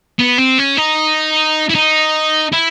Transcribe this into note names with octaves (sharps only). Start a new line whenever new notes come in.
B3
C4
C#4
D#4
E4
D#4
E4